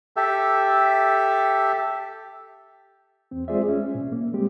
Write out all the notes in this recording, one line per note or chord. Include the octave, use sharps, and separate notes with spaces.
G4 A4 E5
E2 C4
G#3 F4 G#4 C5 D5 E5
C#4
A#2
A#3
G3 G#3 C4 G4